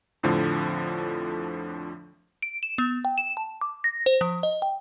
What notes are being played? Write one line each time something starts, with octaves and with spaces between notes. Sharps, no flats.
F2 A2 D3 F3
D7
E7
B3
G5
E7
A5
D6
A#6
C5
F3
D#5
G5